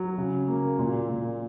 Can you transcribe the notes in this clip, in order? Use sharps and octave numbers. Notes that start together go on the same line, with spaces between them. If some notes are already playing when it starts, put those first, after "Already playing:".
Already playing: F#3
C#3
A#3
A#2
A#2